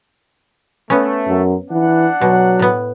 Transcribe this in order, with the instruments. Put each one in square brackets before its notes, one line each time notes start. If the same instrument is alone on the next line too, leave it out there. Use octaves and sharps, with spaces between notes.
[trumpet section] A3 [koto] B3 C#4
[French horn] F#2
[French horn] E3 [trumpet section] D4 F#5
[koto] B2 [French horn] F#3
[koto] A2 B3